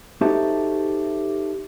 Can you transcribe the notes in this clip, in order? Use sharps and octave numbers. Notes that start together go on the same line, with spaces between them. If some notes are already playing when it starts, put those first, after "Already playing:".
D#4 F#4 G4 A4 C5 E5